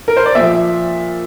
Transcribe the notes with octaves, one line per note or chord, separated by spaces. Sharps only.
A#4
C5
D5
A#2 F3 E5